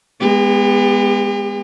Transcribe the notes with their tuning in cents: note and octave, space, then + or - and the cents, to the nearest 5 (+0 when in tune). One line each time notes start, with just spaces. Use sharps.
G#3 -10 B3 +0 G4 +40